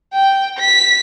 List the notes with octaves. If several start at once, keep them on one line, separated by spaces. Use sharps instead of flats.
G5
B6